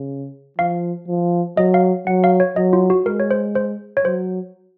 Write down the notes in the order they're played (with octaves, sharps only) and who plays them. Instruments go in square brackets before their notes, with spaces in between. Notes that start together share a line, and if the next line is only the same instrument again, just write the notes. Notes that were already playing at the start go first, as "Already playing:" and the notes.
Already playing: [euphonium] C#3
[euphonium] F3 [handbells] F5
[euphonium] F3
[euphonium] F#3 [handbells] D#5
[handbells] F5
[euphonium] F#3 [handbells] F#5
[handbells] F5
C#5
[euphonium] F#3 [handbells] D#5
[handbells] F4
F#4
[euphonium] G#3 [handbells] A#4
[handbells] C#5
C5
C5
C#5
[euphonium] F#3 [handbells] C5